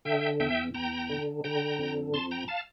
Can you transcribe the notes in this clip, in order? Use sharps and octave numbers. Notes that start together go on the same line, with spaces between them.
D3 E5 G5
E2 E5 G5
E2 G5 A#5
D3
D3 G5 A#5
F2
F2 A5 C6
G5 A#5
F5 A5